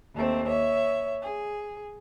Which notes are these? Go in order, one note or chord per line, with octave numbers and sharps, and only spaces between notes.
D#2 A3 C4
C#5 E5
G#4